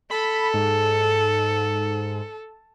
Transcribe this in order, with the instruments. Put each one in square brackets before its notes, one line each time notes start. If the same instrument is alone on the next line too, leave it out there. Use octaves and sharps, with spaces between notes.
[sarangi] A4 [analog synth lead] B5
[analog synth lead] G#2